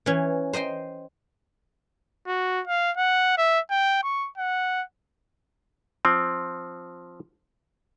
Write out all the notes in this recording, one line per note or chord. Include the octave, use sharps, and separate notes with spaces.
E3 C#4
C5 D#5 G5 C6
F#4
F5
F#5
E5
G5
C#6
F#5
F3 C4